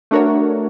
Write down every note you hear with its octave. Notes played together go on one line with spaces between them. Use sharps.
A3 D4 F#4 A#4 C#5